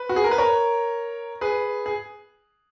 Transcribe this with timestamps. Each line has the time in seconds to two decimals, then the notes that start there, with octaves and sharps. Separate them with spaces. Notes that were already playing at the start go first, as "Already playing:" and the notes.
Already playing: B4
0.09 F#4
0.16 G#4
0.24 A#4
0.31 B4
0.38 A#4 C#5
1.41 G#4 B4
1.86 G#4